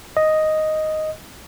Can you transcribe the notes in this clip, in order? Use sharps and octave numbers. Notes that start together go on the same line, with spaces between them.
D#5